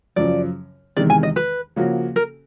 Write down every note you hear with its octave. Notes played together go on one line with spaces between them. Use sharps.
F#2 C#3 F3 D5
E2 C3 D#3 G#3 D5
G#5
D#5
B4
C#3 F3 A#3 C#4 F#4
A#4